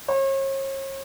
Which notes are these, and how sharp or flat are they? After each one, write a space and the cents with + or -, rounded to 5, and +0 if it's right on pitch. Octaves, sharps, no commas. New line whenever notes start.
C#5 -40